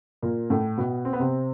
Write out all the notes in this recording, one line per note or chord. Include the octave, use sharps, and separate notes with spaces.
A#2 A#3
A2 A3
B2 B3
C4
B3
C3 C4